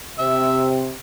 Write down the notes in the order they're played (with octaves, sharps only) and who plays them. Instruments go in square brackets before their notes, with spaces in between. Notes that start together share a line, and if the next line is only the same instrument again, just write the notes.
[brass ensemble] C3 [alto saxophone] E5